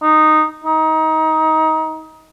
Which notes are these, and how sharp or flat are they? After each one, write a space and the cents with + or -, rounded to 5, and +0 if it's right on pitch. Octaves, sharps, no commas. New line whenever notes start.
D#4 -10
D#4 +25